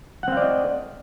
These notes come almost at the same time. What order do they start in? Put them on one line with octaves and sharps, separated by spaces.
F#5 C4 F5 D5 D#5